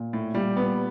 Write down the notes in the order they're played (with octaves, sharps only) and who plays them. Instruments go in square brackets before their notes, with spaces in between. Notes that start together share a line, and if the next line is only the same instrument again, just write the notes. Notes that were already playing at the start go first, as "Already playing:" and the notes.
Already playing: [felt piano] A#2
[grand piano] A2
[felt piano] A#2 [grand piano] G3
[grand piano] B3